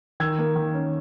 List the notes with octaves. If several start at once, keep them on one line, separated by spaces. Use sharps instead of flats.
D#3 E6 G#6
A#3
D#3
C#4